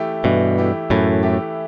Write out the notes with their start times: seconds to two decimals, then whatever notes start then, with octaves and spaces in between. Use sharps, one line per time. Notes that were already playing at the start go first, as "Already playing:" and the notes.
Already playing: E3 A3 E4 G4
0.24 G2 B2 E3
0.58 A3 E4 G4
0.90 F#2 A2 E3
1.23 A3 E4 G4